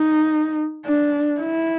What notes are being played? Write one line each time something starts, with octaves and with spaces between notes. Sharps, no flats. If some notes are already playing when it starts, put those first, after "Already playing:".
Already playing: D#4
D4
E4